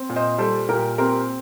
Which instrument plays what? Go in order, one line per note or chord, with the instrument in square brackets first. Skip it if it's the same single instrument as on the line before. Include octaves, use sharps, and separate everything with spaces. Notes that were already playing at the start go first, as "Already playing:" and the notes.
Already playing: [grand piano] C4
A#2
C5 D#5
G3 A4 C5
A#2 G4 A#4
C4 G4 A#4